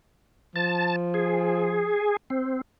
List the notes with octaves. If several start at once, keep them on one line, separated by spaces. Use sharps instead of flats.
F3 A5
G#4
C4